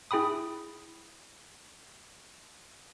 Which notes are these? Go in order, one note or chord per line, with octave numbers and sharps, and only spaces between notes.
E4 G#4 G5 B5 D#6